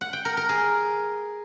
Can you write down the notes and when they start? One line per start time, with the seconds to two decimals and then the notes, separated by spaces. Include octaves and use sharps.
0.01 F#5
0.13 G5
0.25 A#4
0.37 A#4
0.49 G#4